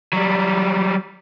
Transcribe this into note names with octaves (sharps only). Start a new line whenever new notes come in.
F#3 G3